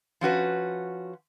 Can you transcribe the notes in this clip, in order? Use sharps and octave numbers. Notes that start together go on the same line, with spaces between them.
F3 C#4 F#4 B4